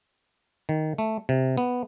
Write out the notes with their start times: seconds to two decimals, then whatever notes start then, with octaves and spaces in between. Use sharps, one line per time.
0.69 D#3
0.98 A3
1.29 C3
1.58 B3